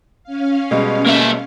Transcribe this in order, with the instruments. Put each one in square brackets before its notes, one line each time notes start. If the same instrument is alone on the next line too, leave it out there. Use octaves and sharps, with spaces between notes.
[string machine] C#4 F5
[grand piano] B2 G3 G#3
[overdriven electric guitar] A#3 E5